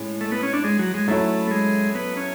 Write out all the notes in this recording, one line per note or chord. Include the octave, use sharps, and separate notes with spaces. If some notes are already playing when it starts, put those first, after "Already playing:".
Already playing: A2 G#3 C#4
A3
B3
C#4
D4
G#3
F#3
G#3
F#3 A3 C#4 E4 A4
G#3
B3
C#4